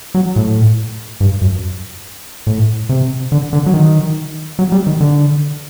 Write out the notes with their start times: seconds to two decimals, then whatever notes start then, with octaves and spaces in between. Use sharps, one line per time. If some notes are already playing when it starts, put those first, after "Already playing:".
0.15 F#3
0.36 A2
1.21 G2
1.41 F#2
2.47 A2
2.89 C3
3.32 D3
3.53 D3
3.66 F#3
3.74 D#3
4.59 F#3
4.72 G3
4.87 D#3
5.01 D3